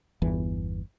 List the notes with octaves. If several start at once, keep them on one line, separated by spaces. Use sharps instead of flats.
G1 E2 E3